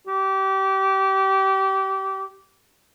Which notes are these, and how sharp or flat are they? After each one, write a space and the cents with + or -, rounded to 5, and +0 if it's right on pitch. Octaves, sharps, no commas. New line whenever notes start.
G4 -25